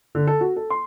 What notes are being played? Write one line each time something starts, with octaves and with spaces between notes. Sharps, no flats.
D3
A4
F#4
A4
C6